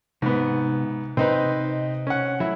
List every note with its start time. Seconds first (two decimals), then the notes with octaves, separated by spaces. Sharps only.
0.22 G#2 C3 B3
1.17 C3 C4 D#4 B4 D#5
2.07 C#4 F#5
2.40 F#3 A3 E4